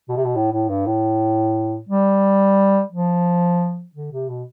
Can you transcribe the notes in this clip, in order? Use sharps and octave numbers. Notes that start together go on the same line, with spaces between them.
B2
C3
B2
A2
A2
G2
A2
G3
F3
D3
C3
B2